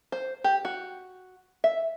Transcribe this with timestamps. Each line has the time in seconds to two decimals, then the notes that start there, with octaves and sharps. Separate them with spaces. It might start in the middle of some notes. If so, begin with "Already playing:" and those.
0.12 C5
0.44 G4
0.65 F#4
1.64 E5